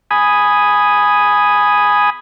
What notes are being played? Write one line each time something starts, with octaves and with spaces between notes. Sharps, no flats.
G#5 B5 D#6